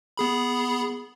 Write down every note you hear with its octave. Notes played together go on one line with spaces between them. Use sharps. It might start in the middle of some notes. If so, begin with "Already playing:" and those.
B3 G#4 B5